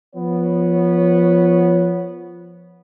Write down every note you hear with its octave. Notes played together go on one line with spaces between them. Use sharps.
F3 B3 C#5